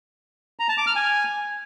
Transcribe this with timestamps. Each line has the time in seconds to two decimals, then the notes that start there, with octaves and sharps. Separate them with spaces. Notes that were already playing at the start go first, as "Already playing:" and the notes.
0.59 A#5
0.69 A5
0.78 D6
0.87 F6
0.96 G#5